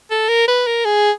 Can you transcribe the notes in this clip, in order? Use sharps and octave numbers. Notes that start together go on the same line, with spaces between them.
A4
A#4
B4
A#4
G#4